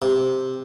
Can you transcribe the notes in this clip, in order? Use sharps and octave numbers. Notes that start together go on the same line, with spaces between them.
C3